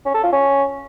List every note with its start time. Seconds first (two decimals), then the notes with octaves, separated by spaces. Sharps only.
0.05 C#4
0.14 A4
0.24 F4
0.33 C#4